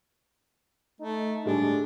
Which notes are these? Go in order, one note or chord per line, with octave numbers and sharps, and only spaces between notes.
A3 D#4
A2 D3 G3 G#3 D4